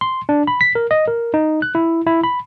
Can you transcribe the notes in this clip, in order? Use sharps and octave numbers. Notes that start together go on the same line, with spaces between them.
C6
D4
B5
B6
A#4
D#5
A#4
D#4
F#6
E4
E4
B5